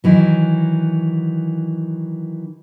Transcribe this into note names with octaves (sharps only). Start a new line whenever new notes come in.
D#3 E3 F#3